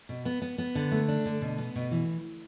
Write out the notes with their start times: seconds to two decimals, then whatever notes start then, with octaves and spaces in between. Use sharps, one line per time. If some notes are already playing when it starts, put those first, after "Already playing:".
0.09 B2
0.25 B3
0.42 B3
0.58 B3
0.75 D3
0.92 A3
1.08 D4
1.26 D3
1.41 B2
1.58 B3
1.76 B2
1.91 E3